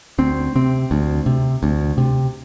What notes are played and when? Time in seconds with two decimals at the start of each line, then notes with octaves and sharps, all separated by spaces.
0.18 D2 C4
0.55 C3 C4
0.91 D2
1.26 C3
1.63 D2
1.98 C3